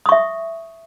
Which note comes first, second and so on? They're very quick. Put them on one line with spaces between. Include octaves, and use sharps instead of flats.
D#6 C#6 E5